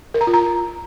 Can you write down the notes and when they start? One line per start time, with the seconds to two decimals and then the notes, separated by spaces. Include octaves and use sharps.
0.14 A#4
0.21 A#5
0.27 F4
0.34 A#5